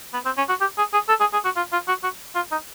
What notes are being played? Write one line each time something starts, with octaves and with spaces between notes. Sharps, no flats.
B3
C4
C#4
F#4
G4
G#4
G#4
A4
G#4
G#4
F#4
F4
F4
F#4
F#4
F4
D#4